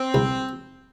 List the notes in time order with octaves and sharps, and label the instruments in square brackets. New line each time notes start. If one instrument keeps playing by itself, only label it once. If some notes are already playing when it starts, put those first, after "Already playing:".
Already playing: [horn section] C4
[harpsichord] C2